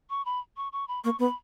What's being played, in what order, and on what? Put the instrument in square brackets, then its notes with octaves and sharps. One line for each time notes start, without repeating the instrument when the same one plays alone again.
[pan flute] C#6
B5
C#6
C#6
B5
[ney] A#3 [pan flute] C#6
[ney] B3 [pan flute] B5